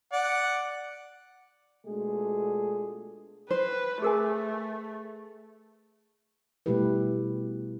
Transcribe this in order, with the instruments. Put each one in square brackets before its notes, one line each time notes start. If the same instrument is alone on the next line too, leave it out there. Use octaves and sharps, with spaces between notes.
[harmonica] D5 F#5
[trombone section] B2 G#3 A3 D4 F4 G#4
[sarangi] B4 [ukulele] C5
[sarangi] A3 [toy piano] G#4 A#4 G#5
[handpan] B2 G3 A3 E4 G4 B4